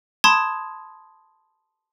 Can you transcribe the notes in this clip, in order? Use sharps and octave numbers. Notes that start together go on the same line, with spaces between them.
A5 B5 C6 D#6 G#6